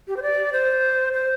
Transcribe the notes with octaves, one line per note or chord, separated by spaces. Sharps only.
G4
C5
D5
C5
C5